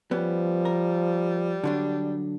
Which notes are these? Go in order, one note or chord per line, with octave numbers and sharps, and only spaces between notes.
F3 G3 B3 C#4
A#4
D3 F#3 D4